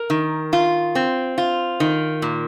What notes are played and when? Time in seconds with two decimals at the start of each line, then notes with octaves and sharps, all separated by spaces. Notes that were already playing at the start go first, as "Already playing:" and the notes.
Already playing: A#4
0.10 D#3
0.53 F4
0.95 C4
1.38 F4
1.80 D#3
2.22 A#2